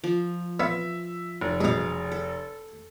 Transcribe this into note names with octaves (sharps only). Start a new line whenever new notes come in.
F3
B3 C4 E5 F5
F1
G2 B2 G#4 F5
A4